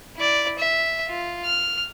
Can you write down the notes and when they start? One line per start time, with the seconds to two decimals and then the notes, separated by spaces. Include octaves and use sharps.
0.16 E4 D5
0.59 E5
1.08 F4
1.45 F6